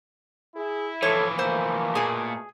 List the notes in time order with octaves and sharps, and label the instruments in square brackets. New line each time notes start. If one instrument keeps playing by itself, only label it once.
[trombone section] E4 [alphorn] G#4
[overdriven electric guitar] E3 F3 [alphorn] A4 [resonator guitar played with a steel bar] C#5
[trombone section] B2 A3 [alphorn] A#3 [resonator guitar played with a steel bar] C5
[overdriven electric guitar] A#2 [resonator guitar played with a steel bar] G#4 G#5